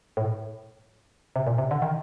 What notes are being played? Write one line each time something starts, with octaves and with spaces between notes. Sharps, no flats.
A2
C3
A#2
C3
D3
D#3